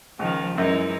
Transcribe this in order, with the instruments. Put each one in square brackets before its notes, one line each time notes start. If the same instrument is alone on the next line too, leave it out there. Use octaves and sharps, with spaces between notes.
[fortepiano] C#2 [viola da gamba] D#3 F3
[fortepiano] F#2 [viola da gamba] E3 G#3 D#4